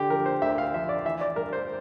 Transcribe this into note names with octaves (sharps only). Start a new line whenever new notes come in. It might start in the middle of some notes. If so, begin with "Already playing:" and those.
Already playing: D3 G4
F3 A#4
C5
D2 E5
F5
F3 E5
D5
E3 E5
D5
G2 A#4
C5